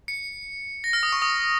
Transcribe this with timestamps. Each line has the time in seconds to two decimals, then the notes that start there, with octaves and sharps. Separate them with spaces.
0.08 C#7
0.84 A#6
0.93 F6
1.03 D#6
1.12 C#6
1.22 D#6